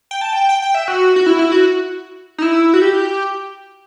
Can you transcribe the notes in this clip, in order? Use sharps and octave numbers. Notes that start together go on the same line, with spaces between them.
G5
A5
G5
G5
G5
E5
F#4
F#4
E4
E4
F#4
D#4
E4
F#4
G4